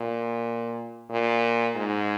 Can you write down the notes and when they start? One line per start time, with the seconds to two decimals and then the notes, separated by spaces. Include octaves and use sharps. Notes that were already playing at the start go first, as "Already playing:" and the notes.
Already playing: A#2
1.10 A#2
1.75 G#2